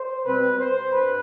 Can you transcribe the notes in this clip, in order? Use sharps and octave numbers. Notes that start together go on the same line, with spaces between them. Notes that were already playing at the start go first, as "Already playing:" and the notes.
Already playing: C5
B2 G3 C4 B4
C5
G2 B4